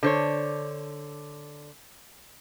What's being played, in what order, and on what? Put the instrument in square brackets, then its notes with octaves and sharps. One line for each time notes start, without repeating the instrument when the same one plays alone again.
[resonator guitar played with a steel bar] D3 C5 C#5